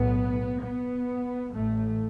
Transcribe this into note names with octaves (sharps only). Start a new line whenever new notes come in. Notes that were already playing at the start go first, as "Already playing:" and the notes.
Already playing: B1 A2 B3
B3
A1 A2 A3